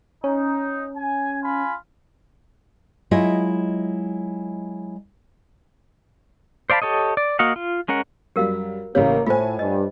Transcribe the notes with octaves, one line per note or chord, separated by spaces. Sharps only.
C#4 D#4
G#5
F4 G#5 B5
F#3 G#3 E4 F4 D#5 E5
C5 D5 F5 A5 B5
G4 A4 C#5 D#5
D5
A#3 F#4 D#5 F5 F#5
F4
G#3 C#4 A#4 F#5
F#2 G3 G4 A#4 F5
A1 C#3 A#3 G4 C#5
A2 A3 F4 C5 G#5
G2 D#5